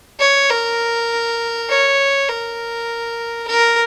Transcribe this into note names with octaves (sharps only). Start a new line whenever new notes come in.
C#5
A#4
C#5
A#4
A#4